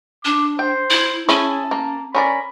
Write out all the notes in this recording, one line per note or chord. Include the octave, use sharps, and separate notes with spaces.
D4 D6
C5 G5
E4
C#4 E4 G#4 C#5 A5
A#3
C#4 A#4 D5 B5